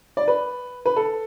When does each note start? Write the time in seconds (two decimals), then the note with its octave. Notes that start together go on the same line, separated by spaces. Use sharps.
0.17 D5
0.28 B4
0.86 B4
0.96 A4